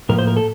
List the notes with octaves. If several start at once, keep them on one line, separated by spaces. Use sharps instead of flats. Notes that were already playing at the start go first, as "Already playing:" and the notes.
A2 F3 A#3 A#4
C5
A#4
A4